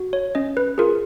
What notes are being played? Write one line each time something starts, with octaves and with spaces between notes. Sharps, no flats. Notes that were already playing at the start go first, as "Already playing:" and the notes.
Already playing: F#4
C#5
C#4 D#5
B4
F4 G#4 A#4